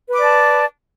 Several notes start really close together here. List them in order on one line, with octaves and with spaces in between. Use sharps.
B4 D6 D5 A5